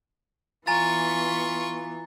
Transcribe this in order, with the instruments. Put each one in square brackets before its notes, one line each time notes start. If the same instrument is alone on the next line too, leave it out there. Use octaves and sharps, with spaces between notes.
[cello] E3 B3 [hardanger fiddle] F4 C#6 [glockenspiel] G#5 A#5 A6